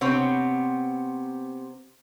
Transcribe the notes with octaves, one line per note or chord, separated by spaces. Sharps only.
C3 B3 C4 C#5